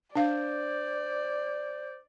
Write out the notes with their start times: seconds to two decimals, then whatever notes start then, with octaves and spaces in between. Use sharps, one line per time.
0.15 D4 C5 D5 F5